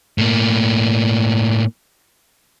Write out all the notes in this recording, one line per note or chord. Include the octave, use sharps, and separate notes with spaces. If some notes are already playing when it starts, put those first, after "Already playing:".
A2 A#3